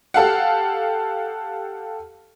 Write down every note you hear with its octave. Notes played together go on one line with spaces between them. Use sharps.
G4 A4 F5 F#5